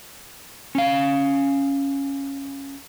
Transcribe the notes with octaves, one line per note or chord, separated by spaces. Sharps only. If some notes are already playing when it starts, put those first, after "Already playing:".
C#4 F5